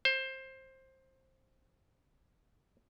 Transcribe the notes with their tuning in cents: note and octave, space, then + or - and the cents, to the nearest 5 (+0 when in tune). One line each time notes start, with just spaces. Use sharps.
C5 +15